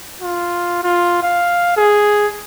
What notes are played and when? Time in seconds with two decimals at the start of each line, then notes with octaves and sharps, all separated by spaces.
0.21 F4
0.83 F4
1.23 F5
1.77 G#4